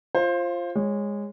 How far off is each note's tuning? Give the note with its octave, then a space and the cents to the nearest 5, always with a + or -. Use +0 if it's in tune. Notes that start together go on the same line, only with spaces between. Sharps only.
F4 -10 C5 +20
G#3 -20 C#5 -10